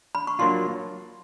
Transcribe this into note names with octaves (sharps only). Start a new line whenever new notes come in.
B5
C#6
F#3 A#3 D4 F4 C6